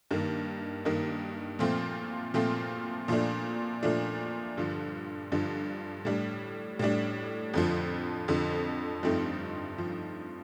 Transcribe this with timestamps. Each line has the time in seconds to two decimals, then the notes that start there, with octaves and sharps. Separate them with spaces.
0.11 G2 D#3 A#3
0.85 G2 D#3 A#3
1.59 A#2 F3 A3 C4 F4
2.34 A#2 F3 A3 C4 F4
3.08 A#2 F3 A3 D4
3.83 A#2 F3 A3 D4
4.57 G2 D3 F3
5.32 G2 D3 F3
6.05 A2 G3 D4
6.79 A2 G3 D4
7.54 F2 D3 F3
8.28 F2 D3 F3
9.03 G2 F3 A3 C4 D#4
9.78 F3